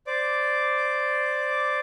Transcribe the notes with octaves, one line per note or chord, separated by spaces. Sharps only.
C5 D5 D6